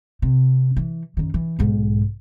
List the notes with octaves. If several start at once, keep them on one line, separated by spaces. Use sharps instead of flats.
C3
E3
F#1 D#3
E3
B1 G#2